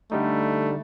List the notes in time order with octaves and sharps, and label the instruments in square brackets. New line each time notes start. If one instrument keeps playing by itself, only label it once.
[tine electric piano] D3 G3 D#4 [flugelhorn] A3